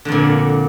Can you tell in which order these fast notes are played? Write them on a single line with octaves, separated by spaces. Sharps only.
D3 F2 A#2